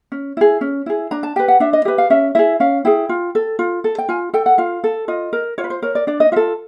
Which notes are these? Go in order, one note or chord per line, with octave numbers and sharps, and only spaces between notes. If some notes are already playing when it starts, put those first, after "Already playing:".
C#4
E4 G#4
C#4
E4 G#4
D4 A#5
A5
G4 B4 G5
F#5
D4 E5
D#5
G4 B4 E5
F5
C#4 E5
E4 G#4 E5
C#4 F5
E4 G#4 G5
F4
A4
F4
A4
G5
F4 G#5
A4 G5
F#5
F4 F5
A4
F4 D#5
A#4
F4 C#5
B4
C5
A#4 C#5
D5
D4 D5
D#5
F4 A4 E5